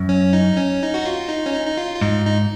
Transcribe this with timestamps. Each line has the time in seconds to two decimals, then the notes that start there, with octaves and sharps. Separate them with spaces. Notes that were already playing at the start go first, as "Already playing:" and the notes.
Already playing: F#2
0.09 C#4
0.33 D#4
0.57 C#4
0.82 D#4
0.94 F#4
1.06 F4
1.29 D#4
1.46 C#4
1.53 D#4
1.67 D#4
1.78 F4
1.96 F4
2.01 G#2 D#4
2.26 D#4